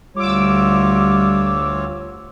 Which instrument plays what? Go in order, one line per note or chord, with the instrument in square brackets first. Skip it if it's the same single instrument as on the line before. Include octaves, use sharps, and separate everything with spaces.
[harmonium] D2 F4 C#5 [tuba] G3 [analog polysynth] D6 E6